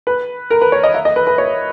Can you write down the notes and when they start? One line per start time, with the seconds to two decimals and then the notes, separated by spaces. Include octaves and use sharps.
0.07 B4
0.50 A#4
0.61 B4
0.72 C#5
0.83 D#5
0.94 E5
1.05 D#5
1.16 B4
1.27 B4
1.38 C#5